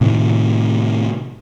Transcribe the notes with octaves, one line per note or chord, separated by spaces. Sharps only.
A2 C3 D#3